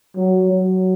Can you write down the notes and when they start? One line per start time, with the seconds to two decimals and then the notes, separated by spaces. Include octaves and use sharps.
0.16 F#3
0.53 F#3